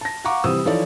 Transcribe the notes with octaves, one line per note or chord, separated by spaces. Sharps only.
A5 A#6
F5 F#5 A#5 C#6 D6
C3 E3 G3 C5 D#6 E6
E3 F3 D#4 A4 C#5 D5